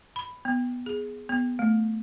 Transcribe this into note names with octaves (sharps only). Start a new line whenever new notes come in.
B5
B3
G#4
B3
A3